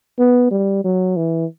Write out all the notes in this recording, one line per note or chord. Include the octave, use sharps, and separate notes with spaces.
B3
G3
F#3
E3